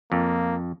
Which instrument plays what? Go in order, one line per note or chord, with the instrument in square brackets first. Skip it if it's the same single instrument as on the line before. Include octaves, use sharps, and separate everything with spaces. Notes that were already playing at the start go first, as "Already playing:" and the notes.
[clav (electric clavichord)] F2 [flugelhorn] A#3